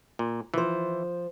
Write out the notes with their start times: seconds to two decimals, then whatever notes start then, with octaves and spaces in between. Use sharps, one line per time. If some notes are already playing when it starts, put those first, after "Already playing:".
0.19 A#2
0.54 E3 F3 C5